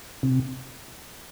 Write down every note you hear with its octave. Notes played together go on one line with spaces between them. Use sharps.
C3